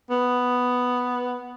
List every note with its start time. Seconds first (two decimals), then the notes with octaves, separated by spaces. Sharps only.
0.10 B3